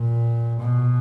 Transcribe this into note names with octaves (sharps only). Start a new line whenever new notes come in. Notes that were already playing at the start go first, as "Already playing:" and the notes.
Already playing: A#2
B2